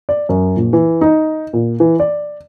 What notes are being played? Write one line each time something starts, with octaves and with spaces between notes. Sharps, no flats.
D5
F#2
A#1
E3
D#4
A#2
E3
D5